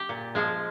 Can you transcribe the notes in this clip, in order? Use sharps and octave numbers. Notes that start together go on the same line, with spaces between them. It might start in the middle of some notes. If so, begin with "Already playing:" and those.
Already playing: G4
A#2
F3 G#3